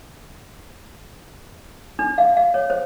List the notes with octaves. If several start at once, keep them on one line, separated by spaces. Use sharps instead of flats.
D4
F5
F5
C#5
C5